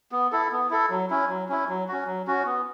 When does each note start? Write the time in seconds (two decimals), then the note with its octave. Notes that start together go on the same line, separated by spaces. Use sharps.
0.12 B3
0.32 E4 A4
0.52 B3
0.70 E4 A4
0.90 F#3
1.10 C#4 E4
1.29 F#3
1.49 C#4 E4
1.69 F#3
1.88 C#4 F#4
2.07 F#3
2.27 C#4 F#4
2.46 B3